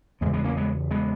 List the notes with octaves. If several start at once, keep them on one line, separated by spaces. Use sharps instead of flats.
E2 C#3 G#3 B3
G#3 B3
A#3 C#4
G#3 B3
G#3 B3